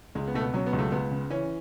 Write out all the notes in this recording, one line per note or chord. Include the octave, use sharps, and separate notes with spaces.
C#2 G#3
B3
B2 A3
B3
F#3 C#4
B3
C#2
A3
C#2 B3
C#3
E3 C#4